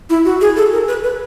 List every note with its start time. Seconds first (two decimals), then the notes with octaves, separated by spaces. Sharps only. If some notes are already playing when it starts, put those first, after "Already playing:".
0.10 E4
0.25 F#4
0.41 G#4
0.57 A4
0.73 A#4
0.88 B4
1.04 B4